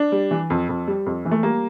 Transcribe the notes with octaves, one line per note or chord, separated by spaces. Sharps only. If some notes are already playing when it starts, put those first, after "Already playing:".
Already playing: D4
G3
E3
F2
F2
G3
F2
E3
A3
G3 A#3